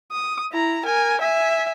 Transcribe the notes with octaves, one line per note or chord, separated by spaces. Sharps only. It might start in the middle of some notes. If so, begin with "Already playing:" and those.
D#6
E4 A#5
A#4 G#5
E5 G#5